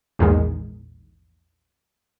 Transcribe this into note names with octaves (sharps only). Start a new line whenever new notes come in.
A#1 E2 G#2 D#3 G#3